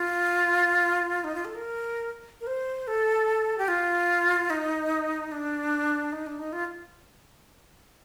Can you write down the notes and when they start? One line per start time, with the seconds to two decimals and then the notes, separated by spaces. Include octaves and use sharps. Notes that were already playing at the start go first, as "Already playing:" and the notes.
Already playing: F4
1.24 D#4
1.35 F4
1.45 A4
1.55 A#4
2.41 A#4
2.47 C5
2.87 A4
3.58 G4
3.68 F4
4.50 D#4
5.32 D4
6.12 D#4
6.27 D4
6.39 D#4
6.53 F4